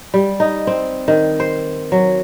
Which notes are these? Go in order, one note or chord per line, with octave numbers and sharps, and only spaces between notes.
G3
D#4
C4
D#3
C5
F#3